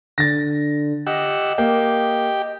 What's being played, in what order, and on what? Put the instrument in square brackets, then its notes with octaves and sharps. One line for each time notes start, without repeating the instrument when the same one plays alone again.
[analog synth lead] D3 [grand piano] A6 A#6
[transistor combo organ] G4 F#5 E6 [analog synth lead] D#5
[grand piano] A#3 [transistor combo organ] G4 G5